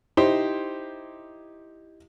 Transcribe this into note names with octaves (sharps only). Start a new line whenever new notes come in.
D#4 E4 G4 C5